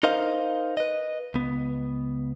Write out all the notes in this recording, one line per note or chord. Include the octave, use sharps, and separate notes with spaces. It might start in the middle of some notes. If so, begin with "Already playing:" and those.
D#4 A#4 C5 D#5 F5
B4 D#5
C#2 B3